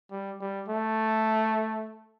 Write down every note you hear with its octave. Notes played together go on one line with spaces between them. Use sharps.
G3
G3
A3